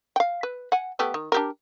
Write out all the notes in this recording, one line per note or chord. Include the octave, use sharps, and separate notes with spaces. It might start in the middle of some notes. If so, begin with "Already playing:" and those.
F5 G5
B4
F#5 G#5
A3 B3 G4
D#3
D4 G4 A#4